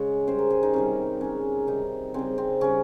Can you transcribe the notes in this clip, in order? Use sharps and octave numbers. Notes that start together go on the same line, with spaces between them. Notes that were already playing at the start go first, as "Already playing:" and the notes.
Already playing: C#3 G#3 C#5
C#3 G3 C5
A#4
G#4
D#4
C3 D#3 G3 C#4
C#3 G#3 C#4
C3 D#3 G3 D#4
C#3 G3 C4
C4
C#3 G3 C#4